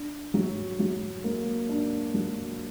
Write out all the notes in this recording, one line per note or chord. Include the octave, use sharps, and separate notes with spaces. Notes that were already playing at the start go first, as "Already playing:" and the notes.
Already playing: D4
F#3
F#3
A#3
D4
F#3